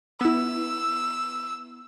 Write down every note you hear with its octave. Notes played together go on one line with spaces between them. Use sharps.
B3 E4 E6